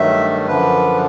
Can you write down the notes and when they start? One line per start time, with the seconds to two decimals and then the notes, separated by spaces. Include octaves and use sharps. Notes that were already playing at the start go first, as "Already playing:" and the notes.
Already playing: G2 D#3 F#3 A3 E5
0.47 F#2 D3 F3 B4